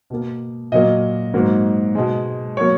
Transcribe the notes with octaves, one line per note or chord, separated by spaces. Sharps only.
B2 A#3
A#2 F#3 A#3 D#5
G#2 F#3 A#3
B2 G#3
F#3 A#3 C#5